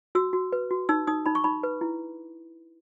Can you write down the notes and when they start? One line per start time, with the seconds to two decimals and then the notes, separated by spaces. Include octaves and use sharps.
0.15 F#4 E6
0.33 F#4
0.52 B4
0.71 F#4
0.89 D#4 E6
1.07 D#4 D#6
1.26 D#4 B5
1.35 C#6
1.44 D#4 B5
1.63 B4
1.81 E4